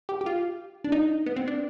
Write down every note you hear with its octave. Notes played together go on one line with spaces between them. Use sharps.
G4
G4
F4
D4
D#4
B3
C4
D4